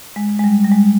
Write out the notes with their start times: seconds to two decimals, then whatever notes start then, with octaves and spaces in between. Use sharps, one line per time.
0.16 G#3
0.39 G#3
0.44 G3
0.65 G3
0.71 G#3